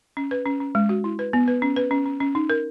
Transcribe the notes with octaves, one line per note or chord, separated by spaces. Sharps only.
C#4
B4
C#4
C#4
G#3
F#4
E4
B4
B3
B4
C#4
B4
C#4
C#4
C#4
D#4
A#4